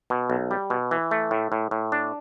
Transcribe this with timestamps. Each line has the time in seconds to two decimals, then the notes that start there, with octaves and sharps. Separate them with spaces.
0.10 B2
0.30 B1
0.51 G3
0.70 B2
0.91 E3
1.11 A3
1.31 A2
1.52 A2
1.71 A2
1.92 D4